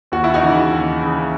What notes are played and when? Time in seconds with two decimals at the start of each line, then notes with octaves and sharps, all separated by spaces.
0.12 D#2 F#4
0.24 E4
0.34 D#4 F#4
0.42 C#3 E3
0.72 D#2
1.02 C#3 E3